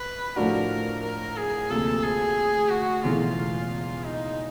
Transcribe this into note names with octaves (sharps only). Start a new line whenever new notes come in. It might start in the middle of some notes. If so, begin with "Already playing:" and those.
Already playing: B4
A2 F3 A3 D4 F#4 A#4
A#4
G#4
D2 C3 F3 A#3 A4
G#4
F#4
E1 E2 C#3 E3 A3 F4
D#4